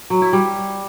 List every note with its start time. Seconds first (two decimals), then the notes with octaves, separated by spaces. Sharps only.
0.10 F#3
0.22 E4
0.33 G3